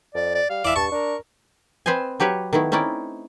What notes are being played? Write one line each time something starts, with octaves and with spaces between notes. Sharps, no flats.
F2 D5
D5
G3 F5
E3 D5 E5
G2 A5 C#6
D4 A#4
C4 B4 C5 D#5 G#5
F#3 G4 B4 C#5 E5
D#3 A3 B3 E4
C4 C#4 D#4 E4 D5